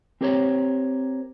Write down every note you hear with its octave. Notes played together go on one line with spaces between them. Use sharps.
C4 G4 A#4 C5 C#5 A#5